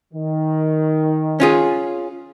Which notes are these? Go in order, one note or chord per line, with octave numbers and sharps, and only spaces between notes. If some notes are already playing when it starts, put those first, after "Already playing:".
D#3
C#4 F4 G#4